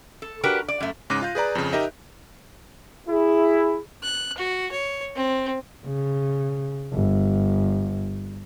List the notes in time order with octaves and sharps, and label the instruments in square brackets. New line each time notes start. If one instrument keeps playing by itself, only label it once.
[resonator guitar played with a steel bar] A4
D4 F#4 G4 A#4 B4
D5
F#2 A3
[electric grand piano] G#2 C#3 D6 F#6 A#6 D#7
F4 F5 G6
G#4 B4 D5 A#5
F2 C#3
D#4 G4 A#4 D#5 E5
[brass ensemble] E4 G#4
[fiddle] F#6
F#4
C#5
C4
[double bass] C#3
G1